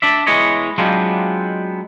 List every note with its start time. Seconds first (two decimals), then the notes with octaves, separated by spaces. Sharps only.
0.02 D4 D5 E5
0.27 E2 E3 G#3 C#5 D#5
0.78 F#3 G#3 B3 C4 D4 F4